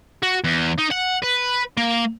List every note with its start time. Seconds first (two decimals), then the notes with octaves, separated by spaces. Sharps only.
0.23 F#4
0.44 E2
0.78 D#4
0.90 F#5
1.22 B4
1.77 A#3